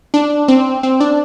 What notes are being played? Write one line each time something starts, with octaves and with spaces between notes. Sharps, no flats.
D4
C4
C4
D4